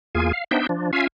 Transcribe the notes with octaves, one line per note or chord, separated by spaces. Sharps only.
E2 A#3 F4 G#4 G#5
F5
B3 D4 D#4 C5 E5 G5
F3 D4
C#4 F4 E5 F5 G#5